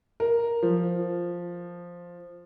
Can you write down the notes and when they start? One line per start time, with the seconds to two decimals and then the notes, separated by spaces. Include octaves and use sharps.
0.20 A#4
0.63 F3